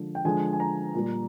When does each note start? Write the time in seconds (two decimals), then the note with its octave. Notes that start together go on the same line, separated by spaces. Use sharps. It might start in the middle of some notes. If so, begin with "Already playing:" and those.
Already playing: D3 F3 G#3
0.15 G5
0.25 D3 F3 G#3 G#5
0.53 G#5
0.60 A#5
0.94 A#2 G3